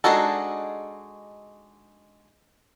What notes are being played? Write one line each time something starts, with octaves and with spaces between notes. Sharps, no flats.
G#3 D4 D#4 F#4 A4